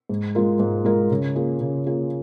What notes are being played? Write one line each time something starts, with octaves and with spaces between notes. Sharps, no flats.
G#2
G#3 F4 A#4
G#2
G#3 F4 A#4
C#3
A#3 F4 G#4
C#3
A#3 F4 G#4